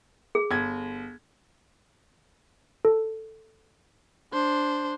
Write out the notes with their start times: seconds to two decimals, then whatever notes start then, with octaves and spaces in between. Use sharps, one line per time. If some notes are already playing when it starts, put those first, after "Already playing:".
0.35 G#4
0.51 G1 G#6
2.85 A4
4.32 D4 C5